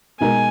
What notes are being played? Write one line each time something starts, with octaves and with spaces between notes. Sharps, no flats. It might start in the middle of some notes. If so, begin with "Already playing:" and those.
B2 G#3 D#4 A#4 G#5